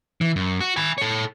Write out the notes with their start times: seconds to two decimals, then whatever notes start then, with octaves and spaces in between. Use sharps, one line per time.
0.21 E3
0.36 F#2
0.60 F#4
0.77 G#5 B5
0.98 A4 C#5